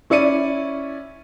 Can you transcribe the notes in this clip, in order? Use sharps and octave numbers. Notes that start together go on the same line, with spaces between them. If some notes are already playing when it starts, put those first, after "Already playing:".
C#4 E4 D5 C#7 D#7